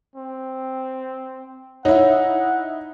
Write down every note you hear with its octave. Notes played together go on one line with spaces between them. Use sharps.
C4
D#4 E4 C#5 F#5